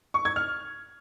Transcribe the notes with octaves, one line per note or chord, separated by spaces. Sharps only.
C#6
G#6
F6